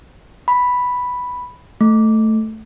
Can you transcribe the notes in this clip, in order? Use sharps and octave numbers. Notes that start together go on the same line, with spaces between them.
B5
A3